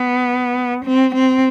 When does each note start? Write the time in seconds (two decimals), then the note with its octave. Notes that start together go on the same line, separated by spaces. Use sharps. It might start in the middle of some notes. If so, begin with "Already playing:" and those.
Already playing: B3
0.86 C4
1.16 C4